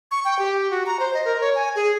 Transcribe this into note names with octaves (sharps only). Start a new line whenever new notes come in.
C#6
G5
G4
F#4
A#5
C5
D#5
A#4
C#5
G#5
G#4